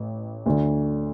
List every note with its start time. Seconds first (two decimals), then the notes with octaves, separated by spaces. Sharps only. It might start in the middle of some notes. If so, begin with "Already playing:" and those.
Already playing: A1
0.46 D2 D3